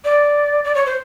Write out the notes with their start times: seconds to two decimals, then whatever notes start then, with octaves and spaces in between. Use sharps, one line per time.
0.04 D5
0.64 D5
0.75 C#5
0.86 C5